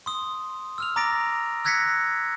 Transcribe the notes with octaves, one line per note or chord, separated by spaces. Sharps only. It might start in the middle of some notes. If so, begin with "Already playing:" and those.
C6 D#6
E6 F6 F7
A#5 D6 A6 A#6 D7
E6 F#6 G#6 A#6 B6 C#7